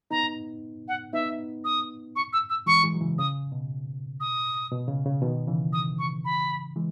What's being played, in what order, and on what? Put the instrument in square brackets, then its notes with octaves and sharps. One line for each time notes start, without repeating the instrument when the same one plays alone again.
[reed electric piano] B3 D#4 [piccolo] A#5
[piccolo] F#5
[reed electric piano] B3 D#4 [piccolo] E5
[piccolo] D#6
C#6
E6
E6
[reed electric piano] E3 G#3 [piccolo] C#6
[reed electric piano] E3 G#3
F#3
C#3 E3
[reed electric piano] C#3 [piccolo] D#6
[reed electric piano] B2
[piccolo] D#6
[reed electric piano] B2
C#3
C#3
B2 D#3
C#3 E3
[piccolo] D#6
C#6
B5
[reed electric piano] E3 G#3